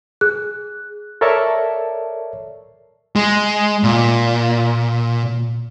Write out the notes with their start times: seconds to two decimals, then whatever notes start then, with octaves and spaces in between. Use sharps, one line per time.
0.21 G#4 F#6
1.21 A4 A#4 C#5 D5 E5 A5
3.16 G#3
3.83 A#2